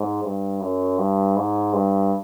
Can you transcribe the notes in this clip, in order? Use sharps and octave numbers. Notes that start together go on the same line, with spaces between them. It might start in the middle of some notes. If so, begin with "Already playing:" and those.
Already playing: G#2
G2
F#2
G2
G#2
G2